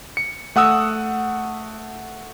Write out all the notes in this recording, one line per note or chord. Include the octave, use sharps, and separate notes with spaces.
C#7
A3 F#5 D#6 E6